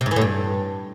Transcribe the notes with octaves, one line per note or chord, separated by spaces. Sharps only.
C3
G#2
E3
A2
G2